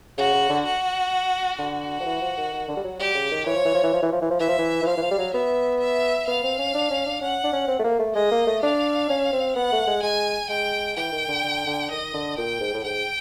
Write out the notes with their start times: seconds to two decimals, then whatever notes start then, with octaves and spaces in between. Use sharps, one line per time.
0.18 C#3 F#4
0.34 C#3
0.49 D3
0.65 F#4
1.58 D3 F#4
2.00 F3
2.06 E3
2.21 F3
2.37 D#3
2.53 D#3
2.68 D3
2.77 G3
2.84 F#3
2.99 G3 G4
3.14 C#3
3.31 D#3
3.46 E3 C#5
3.56 F3
3.65 E3
3.74 F3
3.84 E3
3.93 F3
4.02 E3
4.12 F3
4.22 E3
4.30 F3
4.40 E3 E5
4.49 F3
4.58 E3
4.83 E3
4.87 F3 F5
4.97 E3
5.02 F3
5.11 G3
5.18 F#3
5.34 B3 E5
5.80 E5
6.27 B3 F5
6.43 C4
6.58 C#4
6.74 D4
6.90 C#4
7.06 D4
7.21 C#4 F#5
7.44 D4
7.52 C#4
7.68 C4
7.79 A3
7.84 A#3
7.99 A3
8.15 G#3 D#5
8.31 A#3
8.47 A3
8.62 D4 F5
9.09 C#4
9.33 C4
9.56 B3 F#5
9.72 A3
9.87 G#3
10.03 G#3 G#5
10.49 G#3 G5
10.97 E3 G5
11.12 D#3
11.28 D3
11.43 D3
11.67 D3
11.91 D#3 D#5
12.14 D3
12.37 A#2 G5
12.60 G#2
12.74 A2
12.84 G#2 G5